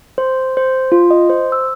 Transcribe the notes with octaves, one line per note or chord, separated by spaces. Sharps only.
C5
C5
F4
D#5
C5
E6